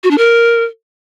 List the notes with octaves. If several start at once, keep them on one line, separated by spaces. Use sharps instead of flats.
F#4
D4
A#4